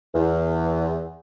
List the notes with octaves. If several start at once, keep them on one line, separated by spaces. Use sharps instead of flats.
E2